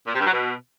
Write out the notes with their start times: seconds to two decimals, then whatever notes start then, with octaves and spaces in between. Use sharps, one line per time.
0.07 A#2
0.14 C3
0.20 G2
0.27 F#3
0.33 B2